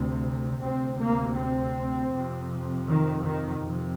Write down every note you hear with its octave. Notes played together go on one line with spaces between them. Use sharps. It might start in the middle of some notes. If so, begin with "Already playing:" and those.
Already playing: D2 C3
D2 C3 C4
A#3
C4
F2 C3
D#3
D#3
F2 C3